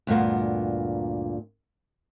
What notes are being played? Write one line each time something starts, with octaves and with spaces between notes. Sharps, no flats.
D2 G2 A#2 A#3 B3